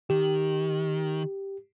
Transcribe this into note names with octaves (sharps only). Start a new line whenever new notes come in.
D#3 G4